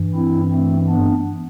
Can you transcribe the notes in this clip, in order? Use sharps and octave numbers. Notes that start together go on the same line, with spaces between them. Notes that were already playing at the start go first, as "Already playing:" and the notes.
Already playing: G2 E3
C4 E4
A3 C4
B3 D4